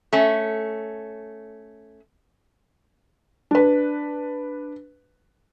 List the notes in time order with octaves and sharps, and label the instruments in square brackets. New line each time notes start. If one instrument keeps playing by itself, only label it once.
[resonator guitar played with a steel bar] A3 C#4
[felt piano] D4 B4